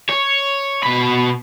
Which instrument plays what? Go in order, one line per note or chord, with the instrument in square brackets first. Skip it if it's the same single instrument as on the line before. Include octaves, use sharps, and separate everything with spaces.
[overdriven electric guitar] C#5
B2 B5